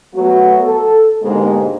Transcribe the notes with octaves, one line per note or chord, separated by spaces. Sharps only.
F#3 A3 B3 F#4
A4
G#2 B2 D3 G#3 A#3 G4